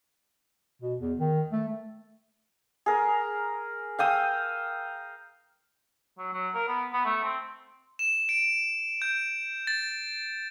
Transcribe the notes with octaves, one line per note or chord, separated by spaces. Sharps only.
B2
E2
D#3
A3
G#4 A#4
F5 G5 D#6 E6
F#3
F#3
A#4
B3
B3
A3
C4
E7
D7
G6
A6